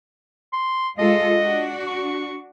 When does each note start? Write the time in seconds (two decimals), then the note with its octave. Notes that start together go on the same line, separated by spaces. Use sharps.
0.53 C6
0.99 G#3 F4 A4 D#5
1.37 D4 F#4
1.87 C#6